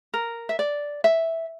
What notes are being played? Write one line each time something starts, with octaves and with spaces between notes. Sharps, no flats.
A#4
E5
D5
E5